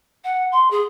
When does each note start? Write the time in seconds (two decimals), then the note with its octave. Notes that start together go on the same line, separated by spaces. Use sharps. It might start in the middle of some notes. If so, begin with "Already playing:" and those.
0.24 F#5
0.52 C6
0.71 G#4